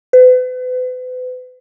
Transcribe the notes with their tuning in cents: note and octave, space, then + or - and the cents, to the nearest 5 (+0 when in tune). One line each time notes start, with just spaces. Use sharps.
B4 +40